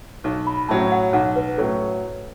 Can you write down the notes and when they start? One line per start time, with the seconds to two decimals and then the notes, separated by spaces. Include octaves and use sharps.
0.24 B1
0.47 B5
0.68 A2 F#3 C#4 A5
0.92 F#5
1.13 B1 F#5
1.36 B4
1.58 A2 F#3 C#4 A4